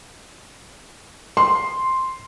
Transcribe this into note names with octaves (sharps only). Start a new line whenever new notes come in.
C6